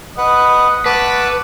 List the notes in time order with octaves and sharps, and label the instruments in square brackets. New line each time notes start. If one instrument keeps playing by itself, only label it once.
[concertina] B4 F#5 [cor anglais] D#5
[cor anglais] A3 [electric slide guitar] B4 [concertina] F#5 A5 D6